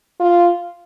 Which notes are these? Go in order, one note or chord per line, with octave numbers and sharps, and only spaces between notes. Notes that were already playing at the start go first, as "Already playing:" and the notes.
F4